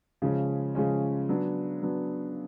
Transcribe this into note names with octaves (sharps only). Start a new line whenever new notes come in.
C#3 F3 G#3 C#4
C#3 F3 G#3 C#4
F#3 B3 D4
F#3 B3 D4